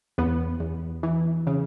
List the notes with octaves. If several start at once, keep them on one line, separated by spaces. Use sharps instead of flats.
E2 B3
E2
E3
C#3